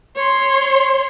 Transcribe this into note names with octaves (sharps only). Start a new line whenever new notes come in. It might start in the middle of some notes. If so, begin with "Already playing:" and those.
C#5 C6